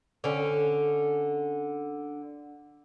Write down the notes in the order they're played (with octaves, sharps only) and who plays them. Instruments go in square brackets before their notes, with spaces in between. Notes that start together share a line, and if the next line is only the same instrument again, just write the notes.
[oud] D3 C#4